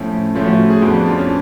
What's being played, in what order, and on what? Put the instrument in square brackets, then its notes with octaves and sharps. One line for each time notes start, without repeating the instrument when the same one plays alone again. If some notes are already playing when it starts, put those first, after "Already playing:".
Already playing: [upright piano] A2 F3 A3 C#4
[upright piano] A2 F3 A3 C#4 [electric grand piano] F4
[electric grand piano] F#4
G#4
[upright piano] F2 F3 B3 [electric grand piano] F4
[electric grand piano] D4
F4
C#4